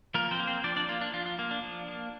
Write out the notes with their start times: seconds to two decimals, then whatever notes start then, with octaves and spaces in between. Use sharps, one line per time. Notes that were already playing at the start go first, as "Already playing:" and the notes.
0.14 F3 A#3 A#4
0.31 C4 C5
0.40 A#3
0.47 C4 C5
0.64 F3 D4 D5
0.77 D4 D5
0.89 A#3 F4
1.01 D4
1.13 F3 F4
1.26 F4
1.39 A#3
1.51 D4
1.63 F3
1.88 A#3